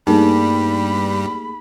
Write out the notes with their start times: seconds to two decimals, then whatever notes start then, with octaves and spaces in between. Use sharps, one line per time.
0.07 G2 G3 A3 A#3 D#4 G#4 B5